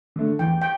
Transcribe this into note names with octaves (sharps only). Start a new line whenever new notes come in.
D3 A3
E2 G5
G5